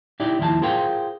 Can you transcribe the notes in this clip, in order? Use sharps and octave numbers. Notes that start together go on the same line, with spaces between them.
D#4 E4 G4 D5
D#2 F3 E4 D#5 A5
F4 G#4 A#4 C5 F5 G5